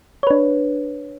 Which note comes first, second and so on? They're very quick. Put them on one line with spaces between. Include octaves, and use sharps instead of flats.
C#5 B4 D4